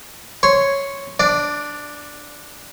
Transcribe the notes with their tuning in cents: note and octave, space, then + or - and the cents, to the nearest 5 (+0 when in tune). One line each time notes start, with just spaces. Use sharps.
C#5 +0 C6 -5
D4 +0 D5 +20